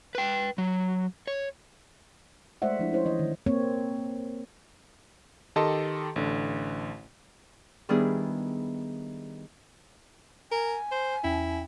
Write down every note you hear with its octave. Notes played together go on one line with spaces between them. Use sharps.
B4 G5
F#3
C#5
G#3 A3 C5 D5 E5 F#5
F3 A3 D4 E4
C#4 E4 C5 C#5
E3 D#5
D#3
A#3 C4 C#5
D#3 G4 A4 D#5 A5 C6
A1 D3
D#3 G3 B3 D4 E4 G#4
A#4 G#5
C5
E2 C#4 E4 G5